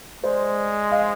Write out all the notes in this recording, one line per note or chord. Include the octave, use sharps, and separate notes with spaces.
G#3 C5 D5
D#5 F5